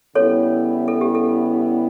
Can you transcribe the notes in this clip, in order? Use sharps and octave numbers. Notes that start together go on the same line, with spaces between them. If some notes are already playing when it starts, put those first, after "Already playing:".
C#3 G3 B3 E4 A4 C#5
A4
G4
A4